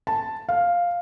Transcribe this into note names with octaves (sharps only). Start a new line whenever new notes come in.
A5
F5